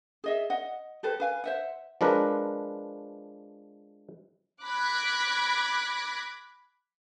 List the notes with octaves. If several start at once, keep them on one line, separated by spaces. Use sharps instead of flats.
G#4 D#5 E5
D#5 F#5
G4 A4 B4 C5
B4 F5 G#5
C5 E5 F#5
F3 G#3 D4 A#4 B4
B5 D6 F#6 G#6 A#6 B6